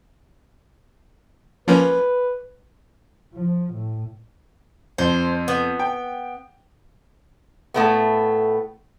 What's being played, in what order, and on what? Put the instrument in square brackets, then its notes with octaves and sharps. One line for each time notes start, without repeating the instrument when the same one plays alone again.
[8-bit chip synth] F3 A#3 C#4 [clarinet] B4
[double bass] F3
A2
[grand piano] F2 [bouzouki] C5
[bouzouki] B3
[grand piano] G5
[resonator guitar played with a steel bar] A2 A3 B3